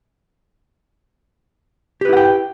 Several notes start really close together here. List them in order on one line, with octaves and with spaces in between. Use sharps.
G4 B4 E4 F#5 G5